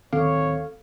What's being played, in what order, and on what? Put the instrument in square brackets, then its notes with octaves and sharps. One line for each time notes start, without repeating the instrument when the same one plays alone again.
[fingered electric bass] D1 D#3 C4 [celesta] A4 [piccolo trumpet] C#5 [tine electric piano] F5